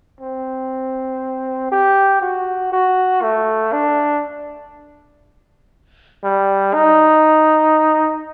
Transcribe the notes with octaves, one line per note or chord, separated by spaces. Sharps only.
C4
G4
F#4
F#4
A3
D4
G3
D#4